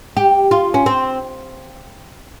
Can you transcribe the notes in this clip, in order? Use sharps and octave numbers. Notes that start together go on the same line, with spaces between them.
G4
F4
C#4
C4